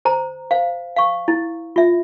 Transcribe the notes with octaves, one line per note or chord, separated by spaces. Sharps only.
C5 A#5
C5 F5
F5 C#6
E4
F4 E5